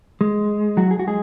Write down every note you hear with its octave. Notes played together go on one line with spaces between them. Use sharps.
G#3
F#3 F#4
G#4
F#4
G#3 G#4